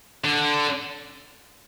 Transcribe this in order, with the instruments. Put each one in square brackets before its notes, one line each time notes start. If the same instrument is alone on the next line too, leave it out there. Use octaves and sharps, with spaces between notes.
[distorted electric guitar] D3